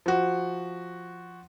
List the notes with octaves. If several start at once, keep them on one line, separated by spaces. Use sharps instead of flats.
F3 F#4